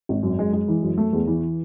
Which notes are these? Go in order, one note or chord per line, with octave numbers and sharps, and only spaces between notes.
G#1
F#2
G#3
G#3
E3
F#2
A3
E2
E3